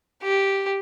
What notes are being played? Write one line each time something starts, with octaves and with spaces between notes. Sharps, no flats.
G4